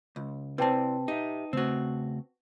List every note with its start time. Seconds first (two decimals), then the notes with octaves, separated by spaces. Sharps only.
0.16 C#2
0.58 C3 C4 E4 B4 D5 G5 A5
1.08 D#4 G4 E5
1.53 C#3 A3 C4 F#4